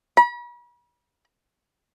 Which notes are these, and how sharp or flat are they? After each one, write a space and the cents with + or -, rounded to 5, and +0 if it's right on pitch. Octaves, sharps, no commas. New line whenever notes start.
B5 -40